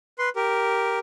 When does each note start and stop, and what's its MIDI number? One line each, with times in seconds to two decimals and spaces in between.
0.19 0.29 71
0.19 0.29 84
0.36 0.99 67
0.36 0.99 70